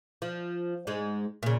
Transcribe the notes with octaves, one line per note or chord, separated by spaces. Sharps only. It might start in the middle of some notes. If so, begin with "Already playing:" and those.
F3
G#2 G#3
A#2 C#3